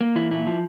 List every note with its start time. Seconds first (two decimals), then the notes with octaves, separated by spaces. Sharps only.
0.01 A#3
0.16 E3 E4
0.31 A#2 E4
0.47 F3